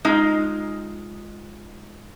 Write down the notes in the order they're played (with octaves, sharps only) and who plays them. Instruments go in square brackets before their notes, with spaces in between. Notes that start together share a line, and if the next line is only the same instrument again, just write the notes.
[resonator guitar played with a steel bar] G#3 D#4 F4